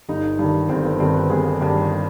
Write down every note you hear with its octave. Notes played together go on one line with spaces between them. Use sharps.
G1 D#4
G2 D#3
G1 C4
B3
G2 D#3 C4
B4
G1 G#4
G2 D#3 G4